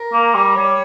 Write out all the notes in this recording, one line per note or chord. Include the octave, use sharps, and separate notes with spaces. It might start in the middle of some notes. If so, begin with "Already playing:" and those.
Already playing: A#4
A#3
G3
G3 C#5